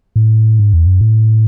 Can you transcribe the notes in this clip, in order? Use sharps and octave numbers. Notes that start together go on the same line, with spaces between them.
A2
G#2
E2
F#2
A2